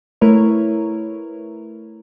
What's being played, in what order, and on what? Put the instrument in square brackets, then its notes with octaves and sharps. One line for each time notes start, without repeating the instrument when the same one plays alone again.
[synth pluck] A3 E4 A#4 B4 C#5